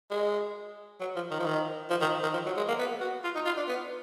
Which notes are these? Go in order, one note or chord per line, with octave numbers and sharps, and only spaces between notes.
G#3
F#3
F3
D#3
F3
D#3
F3
D#3
D#3
F3
F#3
G#3
A#3
B3
F#4
F4
D#4
F4
D4
B3